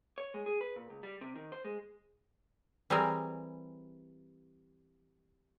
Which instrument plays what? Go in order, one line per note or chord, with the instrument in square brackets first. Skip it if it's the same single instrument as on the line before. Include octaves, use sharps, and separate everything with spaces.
[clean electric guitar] C#5
G#3
G#4
B4
A#2
C#2
G3
C3
D#3
C5
G#3
[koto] E3 G3 C4 G#4 A#4